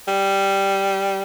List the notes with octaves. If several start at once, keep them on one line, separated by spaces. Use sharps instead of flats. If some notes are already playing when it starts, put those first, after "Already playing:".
G3